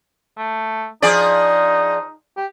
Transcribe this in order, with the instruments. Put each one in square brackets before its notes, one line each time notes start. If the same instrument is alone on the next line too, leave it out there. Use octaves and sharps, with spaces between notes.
[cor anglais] A3
[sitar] F3 G#4 D5 [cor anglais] D#4
[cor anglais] G4